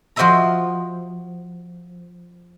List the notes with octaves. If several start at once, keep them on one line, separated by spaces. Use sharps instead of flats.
F3 F#4 C5 D#5 E5 A#5